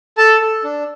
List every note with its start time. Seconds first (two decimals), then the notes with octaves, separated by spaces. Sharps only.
0.17 A4 A5
0.41 A4
0.64 D4